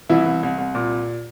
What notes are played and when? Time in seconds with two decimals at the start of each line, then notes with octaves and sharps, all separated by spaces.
0.09 C2 E3 E4
0.26 C2
0.43 C2
0.58 C2
0.75 A#2